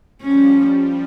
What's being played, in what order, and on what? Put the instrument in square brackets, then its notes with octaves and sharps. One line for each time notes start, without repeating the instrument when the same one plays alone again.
[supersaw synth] F3 G3 [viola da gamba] C#4